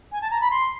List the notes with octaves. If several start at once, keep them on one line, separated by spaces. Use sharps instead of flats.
G#5
A5
A#5
B5
C6